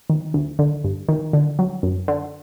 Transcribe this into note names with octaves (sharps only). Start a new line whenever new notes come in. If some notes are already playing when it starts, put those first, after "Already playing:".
D#3
D2
D3
G2
D#3
D3
F#3
F#2
D3